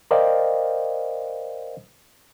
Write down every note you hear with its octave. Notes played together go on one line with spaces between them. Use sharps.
A#4 C5 D5 D#5 F5 G5